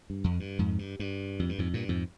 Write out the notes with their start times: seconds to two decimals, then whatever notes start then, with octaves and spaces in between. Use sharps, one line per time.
0.10 G2
0.24 F2
0.40 G2
0.59 F2 G#2
0.79 G2
1.00 G2
1.39 F2
1.49 G2
1.58 F2 G#2
1.74 G2 A#2
1.89 F2 G#2